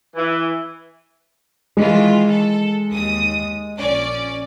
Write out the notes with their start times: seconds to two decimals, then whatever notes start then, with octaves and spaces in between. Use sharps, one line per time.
0.16 E3
1.77 D#3 E3 G#3 F4
2.29 A4
2.90 D#2 D#6
3.76 A#1 C#4 D5